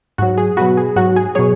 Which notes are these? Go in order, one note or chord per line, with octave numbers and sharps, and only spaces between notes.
G#2 F#3 F#4
G#4
B2 F#3 F#4 B4
G#4
G#2 F#3 F#4
G#4
B2 F#3 G#4 C#5